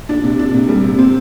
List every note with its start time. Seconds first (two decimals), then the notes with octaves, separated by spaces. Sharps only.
0.09 D4
0.24 C3
0.39 D4
0.54 C3
0.69 G3
0.84 C3
0.99 C4